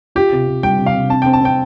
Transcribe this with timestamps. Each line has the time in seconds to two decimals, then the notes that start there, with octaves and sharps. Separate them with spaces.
0.15 F4 G4
0.32 C3
0.47 C3
0.63 G3 G5
0.78 C3
0.86 F5
0.95 C3
1.10 C4 A5
1.22 C4 G5
1.33 A5
1.41 C4 G5